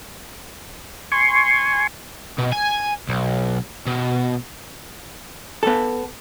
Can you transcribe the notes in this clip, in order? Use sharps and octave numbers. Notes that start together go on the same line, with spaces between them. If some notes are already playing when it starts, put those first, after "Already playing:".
G#5 C6 C#6
B2
G#5
B1
B2
B3 A4